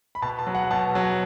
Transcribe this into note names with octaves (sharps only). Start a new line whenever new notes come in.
B5
B2 A5
A5
F#3
F#5
B2 A5
F#3